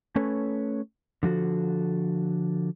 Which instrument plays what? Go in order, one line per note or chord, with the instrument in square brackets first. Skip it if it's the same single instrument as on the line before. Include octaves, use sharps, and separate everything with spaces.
[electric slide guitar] A3 C#4 A4 B4 C#5
D3 F3 F#4 A4